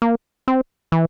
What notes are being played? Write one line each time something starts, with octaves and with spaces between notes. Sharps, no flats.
A#3
C4
E3